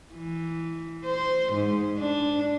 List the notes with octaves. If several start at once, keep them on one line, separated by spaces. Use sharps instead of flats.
E3
C5
G#2
D4